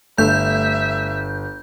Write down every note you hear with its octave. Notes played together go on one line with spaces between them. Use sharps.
G1 A3 E5 G6